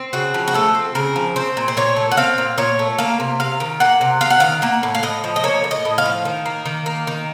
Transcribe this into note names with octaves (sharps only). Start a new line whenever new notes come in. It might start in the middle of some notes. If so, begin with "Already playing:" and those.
Already playing: C4
C#3 F#4
F3
F#4
A3 A4
C4
C#3 A#4
F3
C4 C5
A#2
C5
A#2 C#5
A3
F#5
C4 F5
A#2
A#2 C#5
A3
A#3 F5
C3
C3 F5
D#3
A#3 F#5
C3
C3 F5
F#5
D#3 F5
A#3 F#5
A2
F5
A2 D#5
F3
D#5
A#3 C#5
A2
D#5
A2
F5
F3
D#3
A#3
D#3
A#3
D#3